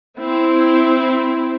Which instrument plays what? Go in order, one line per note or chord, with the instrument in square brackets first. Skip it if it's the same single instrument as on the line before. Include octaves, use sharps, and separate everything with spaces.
[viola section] C4 E4